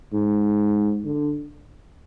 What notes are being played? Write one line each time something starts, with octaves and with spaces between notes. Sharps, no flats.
G#2
D3